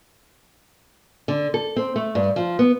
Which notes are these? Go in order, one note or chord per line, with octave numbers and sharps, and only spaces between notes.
D3
A4
C4
A3
G2
F3
B3